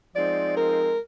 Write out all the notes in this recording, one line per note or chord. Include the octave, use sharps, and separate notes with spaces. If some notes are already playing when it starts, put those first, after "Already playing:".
F3 G#3 C4 D#4 D5
A#4